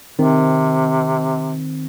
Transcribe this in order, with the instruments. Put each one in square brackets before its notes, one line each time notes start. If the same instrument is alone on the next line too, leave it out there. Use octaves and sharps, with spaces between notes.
[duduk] C3 [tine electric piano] D#3 C4